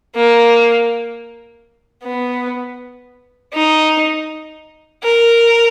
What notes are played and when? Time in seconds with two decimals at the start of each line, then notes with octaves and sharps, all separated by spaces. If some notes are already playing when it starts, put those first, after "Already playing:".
0.16 A#3
2.03 B3
3.53 D#4
5.03 A#4